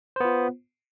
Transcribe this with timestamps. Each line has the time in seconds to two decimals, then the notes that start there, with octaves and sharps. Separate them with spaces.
0.16 C5
0.20 B3
0.25 F4